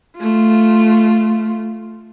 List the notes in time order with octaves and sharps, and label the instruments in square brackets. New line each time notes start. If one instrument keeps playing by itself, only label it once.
[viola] A3 F4